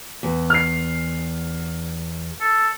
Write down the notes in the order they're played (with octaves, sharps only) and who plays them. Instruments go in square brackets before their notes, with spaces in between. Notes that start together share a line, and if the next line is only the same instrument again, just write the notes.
[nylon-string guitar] E2
[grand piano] F6 C7
[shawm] A4